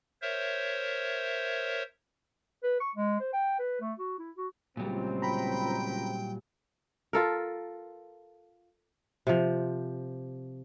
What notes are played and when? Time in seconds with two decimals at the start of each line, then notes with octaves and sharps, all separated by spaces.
0.22 A#4 C5 C#5 E5
2.64 B4
2.80 C#6
2.96 G#3
3.20 C5
3.33 G5
3.59 B4
3.81 A3
3.99 F#4
4.19 E4
4.37 F#4
4.77 C#2 A#2 F#3 G3 C4
5.22 G5 A#5 B5
7.13 F4 A4 A#4
9.27 C3 F3